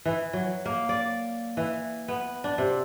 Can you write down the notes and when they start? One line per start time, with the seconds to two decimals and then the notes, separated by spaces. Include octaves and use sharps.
0.05 E3
0.33 F#3
0.66 A#3
0.89 D5
1.57 E3
2.08 B3
2.44 D4
2.58 C3